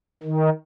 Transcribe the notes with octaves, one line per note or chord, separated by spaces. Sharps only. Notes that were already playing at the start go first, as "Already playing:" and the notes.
D#3